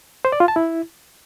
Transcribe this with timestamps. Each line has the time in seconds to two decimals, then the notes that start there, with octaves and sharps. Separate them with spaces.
0.25 C5
0.32 D5
0.40 F4
0.48 A5
0.56 E4